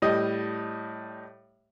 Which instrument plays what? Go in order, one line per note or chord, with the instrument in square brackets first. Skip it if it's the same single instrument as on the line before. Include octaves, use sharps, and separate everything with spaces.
[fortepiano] A2 G3 D#5